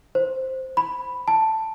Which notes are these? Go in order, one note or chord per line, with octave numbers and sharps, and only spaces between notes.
C5
B5
A5